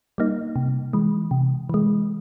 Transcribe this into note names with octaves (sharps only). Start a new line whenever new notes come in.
G3 A#3 D#4
C3
E3 G#3
C3
E3 G#3